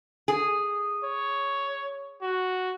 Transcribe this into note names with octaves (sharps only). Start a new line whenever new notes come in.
G#4
C#5
F#4